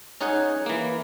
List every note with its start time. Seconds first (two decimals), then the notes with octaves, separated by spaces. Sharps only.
0.21 C#4 D#4 G#4 F#5 G#5
0.66 E3 A#3